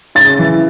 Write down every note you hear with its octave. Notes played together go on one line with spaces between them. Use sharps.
C#3 A6
E3